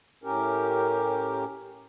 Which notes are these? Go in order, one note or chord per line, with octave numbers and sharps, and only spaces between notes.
A2 C#4 G4 A#4